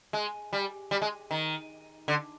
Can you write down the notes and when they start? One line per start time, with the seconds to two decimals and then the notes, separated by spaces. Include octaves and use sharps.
0.13 G#3
0.53 G3
0.91 G3
1.02 G#3
1.31 D#3
2.08 D3